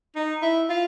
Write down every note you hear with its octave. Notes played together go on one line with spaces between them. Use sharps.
D#4
E4
F4